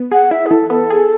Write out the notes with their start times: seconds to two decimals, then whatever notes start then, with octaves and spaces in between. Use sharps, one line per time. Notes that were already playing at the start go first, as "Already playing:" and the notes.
Already playing: B3
0.12 G#4 F#5
0.31 E4 E5
0.46 G#4
0.51 E3 A4
0.70 B3 A4
0.90 G#4